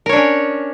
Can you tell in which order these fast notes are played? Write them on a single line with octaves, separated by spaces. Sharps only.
A#4 C#5 D4 C#4